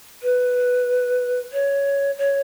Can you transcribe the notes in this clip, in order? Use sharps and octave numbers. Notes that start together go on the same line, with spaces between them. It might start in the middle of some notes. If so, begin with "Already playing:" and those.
B4
C#5
C#5